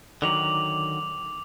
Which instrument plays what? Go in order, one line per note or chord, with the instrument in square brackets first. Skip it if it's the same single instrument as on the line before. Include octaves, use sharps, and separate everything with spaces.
[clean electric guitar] D3 D#3 F#3 [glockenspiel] D6 F7 F#7